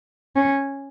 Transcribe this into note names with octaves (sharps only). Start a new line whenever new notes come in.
C#4